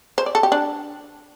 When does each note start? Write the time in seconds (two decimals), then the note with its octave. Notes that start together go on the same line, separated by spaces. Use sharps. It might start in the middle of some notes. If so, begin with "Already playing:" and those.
0.18 C5
0.26 D5
0.35 A4
0.43 G4
0.52 D4